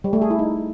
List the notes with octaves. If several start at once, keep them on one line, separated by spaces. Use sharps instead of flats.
G3
A3
G#4
E4
D#4